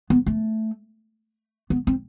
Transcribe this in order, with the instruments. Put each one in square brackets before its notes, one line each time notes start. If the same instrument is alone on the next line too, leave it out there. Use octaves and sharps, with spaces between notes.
[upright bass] B3
A3
B3
C4